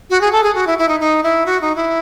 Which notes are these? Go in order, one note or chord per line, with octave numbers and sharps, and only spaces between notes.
F#4
G#4
A4
G#4
F#4
E4
E4
D#4
D#4
E4
F#4
D#4
E4